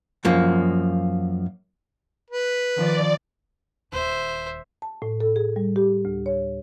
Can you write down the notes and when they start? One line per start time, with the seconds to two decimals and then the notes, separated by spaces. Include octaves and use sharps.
0.25 F#2 F3 A#3
2.30 B4
2.77 D#3 F3 D5
3.92 D#1 D#2 C5 E5
4.82 A5
5.02 A2
5.21 A4
5.36 G#4
5.56 G3
5.76 G4
6.05 D2
6.26 C#5